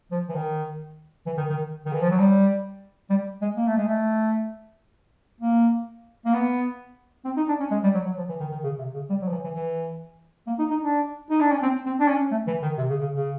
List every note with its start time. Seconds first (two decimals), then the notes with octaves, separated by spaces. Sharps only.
0.11 F3
0.29 E3
0.35 D#3
1.26 E3
1.37 D#3
1.50 D#3
1.85 D#3
1.93 E3
2.02 F3
2.11 F#3
2.19 G3
3.10 G3
3.42 G#3
3.57 A#3
3.67 A3
3.77 G#3
3.87 A3
5.40 A#3
6.25 A#3
6.34 B3
7.25 C4
7.37 D#4
7.48 D4
7.60 C#4
7.71 G#3
7.83 G3
7.94 F#3
8.06 F#3
8.17 F3
8.29 E3
8.40 D#3
8.52 D#3
8.64 C#3
8.78 C3
8.94 C#3
9.10 G3
9.22 F#3
9.29 F3
9.32 E3
9.44 E3
9.55 E3
10.47 A#3
10.59 D#4
10.71 D#4
10.83 D4
11.30 D#4
11.41 D4
11.52 C#4
11.63 C4
11.86 C4
12.00 D4
12.08 C#4
12.31 A3
12.47 E3
12.63 D#3
12.78 C3
12.90 C#3
13.01 C#3
13.13 C#3